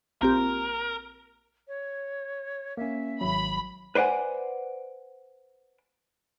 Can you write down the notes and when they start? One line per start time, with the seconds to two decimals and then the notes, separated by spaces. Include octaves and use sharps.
0.22 A#1 C4 G4 A#4
1.68 C#5
2.77 A#3 C#4 E5
3.21 G#1 F#3 B5
3.95 B4 C5 D5 F#5 G#5